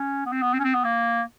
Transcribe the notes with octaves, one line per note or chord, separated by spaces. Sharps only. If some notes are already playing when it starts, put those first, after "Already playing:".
Already playing: C#4
B3
C4
B3
C4
C#4
C4
B3
A#3